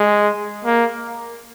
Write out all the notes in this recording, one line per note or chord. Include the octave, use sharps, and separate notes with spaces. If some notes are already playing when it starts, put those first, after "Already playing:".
Already playing: G#3
A#3